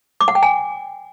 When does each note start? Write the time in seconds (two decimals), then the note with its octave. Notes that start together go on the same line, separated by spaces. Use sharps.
0.21 D6
0.28 F#5
0.35 G5
0.43 G#5